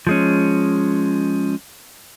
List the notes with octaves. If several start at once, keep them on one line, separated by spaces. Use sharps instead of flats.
F3 G#3 C#4